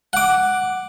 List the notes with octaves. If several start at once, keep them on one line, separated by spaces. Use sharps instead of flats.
F#5 D6